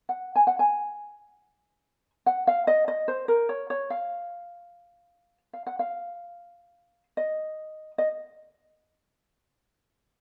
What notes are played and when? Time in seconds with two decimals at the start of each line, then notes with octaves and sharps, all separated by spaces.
0.09 F#5
0.36 G#5
0.47 F#5
0.59 G#5
2.26 F#5
2.47 F5
2.67 D#5
2.88 D#5
3.08 C5
3.28 A#4
3.49 C#5
3.70 C#5
3.90 F5
5.53 F5
5.67 F#5
5.79 F5
7.17 D#5
7.98 D#5